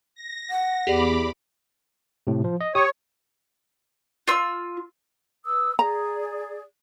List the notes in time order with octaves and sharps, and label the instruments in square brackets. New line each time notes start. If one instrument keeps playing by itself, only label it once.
[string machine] A#6
[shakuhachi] F#5
[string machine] E2 B5 D6 [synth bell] G4 G#4 D5
[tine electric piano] A2 C3
F3
D#5
[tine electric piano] G4 D#6 [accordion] C#5
[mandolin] F4 E6
[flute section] B4 D#6 E6
[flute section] G#4 D5 [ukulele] A#5